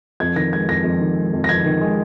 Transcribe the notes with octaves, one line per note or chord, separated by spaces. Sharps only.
F2 G#6
D#3 A#6
G#3 G#6
F2 A#6
F2
D#3
G#3
F2
A#6
F2 G#6
D#3
G#3